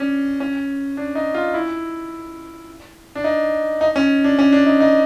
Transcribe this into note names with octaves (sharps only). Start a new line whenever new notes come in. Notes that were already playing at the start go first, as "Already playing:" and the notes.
Already playing: C#4 D4
C#4
D4
D#4
F4
E4
D4
D#4
D#4
C#4
D4
C#4
D4
D#4
D#4